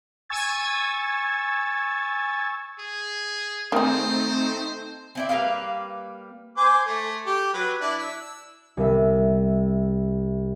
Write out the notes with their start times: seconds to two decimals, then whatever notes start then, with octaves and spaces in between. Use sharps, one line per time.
0.30 G#5 C#6 E6 G#6 A6
2.79 G#4
3.72 D#3 A3 C4 D#4 G#4 C5
5.15 C4 E4 D5
5.29 G3 A#3 B4 F5
6.57 C5 G#5 D6
6.87 A3
7.27 G4
7.54 F#3 B4
7.81 D4 E4
7.99 E6
8.77 C2 E5